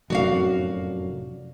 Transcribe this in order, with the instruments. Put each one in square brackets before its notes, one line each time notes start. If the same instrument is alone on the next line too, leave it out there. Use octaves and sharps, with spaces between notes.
[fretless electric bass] F1 F#2 A2 [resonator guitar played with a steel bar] F#4 D5 F5